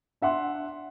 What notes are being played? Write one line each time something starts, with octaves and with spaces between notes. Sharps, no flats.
D4 E5 F#5 C6